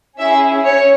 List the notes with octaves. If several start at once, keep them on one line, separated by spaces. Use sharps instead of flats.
C#4 E4 G#4 E5
C#4 C#5